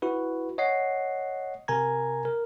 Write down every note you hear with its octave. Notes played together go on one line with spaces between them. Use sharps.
E4 F#4 B4
C#5 D#5 F#5 C7
C3 A#4 G#5 A#5 G#6
A#4